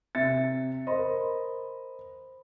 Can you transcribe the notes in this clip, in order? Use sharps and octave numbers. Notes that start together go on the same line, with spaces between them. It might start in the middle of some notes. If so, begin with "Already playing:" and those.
C3 E5 A6 C#7
A#4 C5 D#5 B5 C6